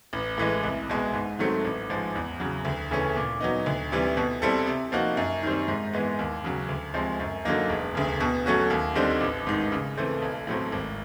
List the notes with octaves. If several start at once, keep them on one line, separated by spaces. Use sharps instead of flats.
A1
A2 E3 G#3
C2
B2 G#3
G#2
D#3 F#3 A3 C4
A1
G#2 F3 G#3
E2
C#3 F#3
D2
C#3 E3 A3 C#4
A#2
F#3 B3 D#4
D2
C3 E3 G3
B2
G3 C4 E4 A4
C3
F3 A#3 D#4 F#4
F#2
D#3 G3 C4
G#2
E3 G#3 B3
D#2
C#3 F#3
D2
C3 F3 G#3 C4
F#2
D3 F#3 A#3 D#4
E1
D2 C#3
B2
F#3 A3 C#4 F#4
D#2
D3 G3 C4 D#4
A1
G#2 D#3
C#3
E3 A3 C4
B1
A2 F#3 A3 C4
G#1